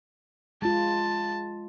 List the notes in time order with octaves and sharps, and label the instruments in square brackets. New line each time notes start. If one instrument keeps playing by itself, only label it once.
[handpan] G#3 F4 [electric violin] A5